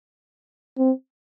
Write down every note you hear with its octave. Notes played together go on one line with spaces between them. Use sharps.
C4